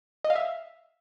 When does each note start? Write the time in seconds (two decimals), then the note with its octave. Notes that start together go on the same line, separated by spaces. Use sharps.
0.24 D#5
0.30 F5
0.35 E5